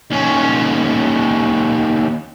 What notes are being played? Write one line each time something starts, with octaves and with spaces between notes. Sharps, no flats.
D#2 C#4